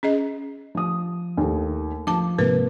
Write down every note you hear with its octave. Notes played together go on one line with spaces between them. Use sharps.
C#4 G#4 D#5
F3 D#6
D#2 A3
F3 A5 D6
G#2 C3 A#3 A#4 B4